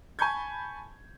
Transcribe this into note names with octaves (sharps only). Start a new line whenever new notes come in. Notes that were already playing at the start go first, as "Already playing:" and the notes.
G#5 A5 B5 C#6 G6 G#6